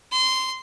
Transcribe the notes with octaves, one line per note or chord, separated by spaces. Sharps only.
C6